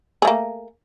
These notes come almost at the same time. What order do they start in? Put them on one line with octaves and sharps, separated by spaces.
G#4 A3 A#3